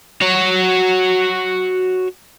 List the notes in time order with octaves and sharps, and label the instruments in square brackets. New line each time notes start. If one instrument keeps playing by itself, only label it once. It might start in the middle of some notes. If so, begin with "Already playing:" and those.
[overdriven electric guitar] F#4 C#5